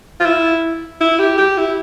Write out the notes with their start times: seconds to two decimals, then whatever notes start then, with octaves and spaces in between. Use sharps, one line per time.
0.20 F4
0.25 E4
1.01 E4
1.19 G4
1.38 G4
1.58 E4